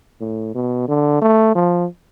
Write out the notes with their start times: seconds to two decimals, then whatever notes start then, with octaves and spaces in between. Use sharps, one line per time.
0.21 A2
0.55 B2
0.88 D3
1.22 A3
1.55 F3